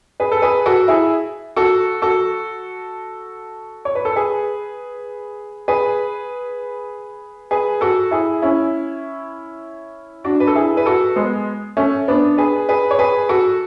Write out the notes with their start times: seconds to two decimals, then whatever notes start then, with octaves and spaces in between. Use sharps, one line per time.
0.20 G#4 B4
0.32 A4
0.42 G#4 B4
0.66 F#4 A4
0.88 E4 G#4
1.56 F#4 A4
2.02 F#4 A4
3.85 C#5
3.95 B4
4.05 A4
4.16 G#4 B4
5.68 G#4 B4
7.51 G#4 B4
7.81 F#4 A4
8.11 E4 G#4
8.42 C#4 E4
10.24 D4 F#4
10.40 B4
10.47 A4
10.55 E4 G#4
10.77 B4
10.86 F#4 A4
11.16 G#3 B3
11.77 A3 C#4
12.08 B3 D4
12.38 G#4 B4
12.69 G#4 B4
12.91 C#5
12.99 G#4 B4
13.29 F#4 A4